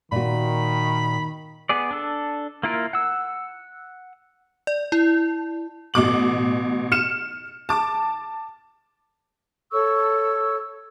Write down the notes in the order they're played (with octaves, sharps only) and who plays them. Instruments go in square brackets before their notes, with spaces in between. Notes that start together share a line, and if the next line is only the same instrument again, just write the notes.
[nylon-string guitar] A#2 F#4 [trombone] D#3 [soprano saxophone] B5
[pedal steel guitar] B3 G#4 D5
D4 A4
A#3 E4 F4 A#4
F#5 E6
[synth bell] D5
E4
[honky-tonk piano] A1 B2 D6 F#7
F6 C#7 E7
A5 D6
[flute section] A4 C#5 C#6 E6